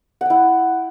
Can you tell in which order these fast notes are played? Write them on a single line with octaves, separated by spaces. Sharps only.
F#5 G5 E4